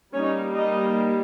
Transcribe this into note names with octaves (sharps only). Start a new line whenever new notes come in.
G3 A#3 C#4 D#4 C#5
D#4 D#5